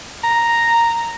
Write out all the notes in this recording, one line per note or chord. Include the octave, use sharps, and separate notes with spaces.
A#5